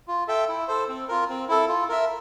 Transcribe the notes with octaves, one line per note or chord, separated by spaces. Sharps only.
F4
A4 E5 G5
E4
A4 C5
C4
F4 A#4
C4
E4 A4
F4
A#4 E5